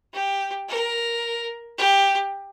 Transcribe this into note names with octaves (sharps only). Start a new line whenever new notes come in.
G4
A#4
G4